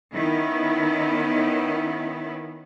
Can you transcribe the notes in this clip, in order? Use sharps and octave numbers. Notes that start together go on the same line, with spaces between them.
D#3 B3 C#4 E4